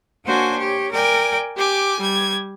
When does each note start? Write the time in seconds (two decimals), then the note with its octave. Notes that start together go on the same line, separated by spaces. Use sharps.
0.24 A#3 D4 F#4 C5 C#5 G#5
0.55 G4 C#5
0.90 A#4 D5 G5 G#5
1.55 G4 G#5 D6
1.99 G3 G#6